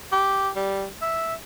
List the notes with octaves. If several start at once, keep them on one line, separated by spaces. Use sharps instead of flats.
G4
G3
E5